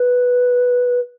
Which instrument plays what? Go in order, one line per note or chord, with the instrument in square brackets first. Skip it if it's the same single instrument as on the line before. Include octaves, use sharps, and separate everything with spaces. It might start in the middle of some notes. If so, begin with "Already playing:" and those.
Already playing: [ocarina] B4